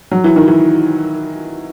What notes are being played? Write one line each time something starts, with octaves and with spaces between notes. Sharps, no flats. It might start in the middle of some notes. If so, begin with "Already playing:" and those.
F#3
E3
D#3
E3